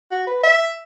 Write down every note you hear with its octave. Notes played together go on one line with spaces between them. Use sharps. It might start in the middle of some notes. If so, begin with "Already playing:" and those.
F#4
B4
E5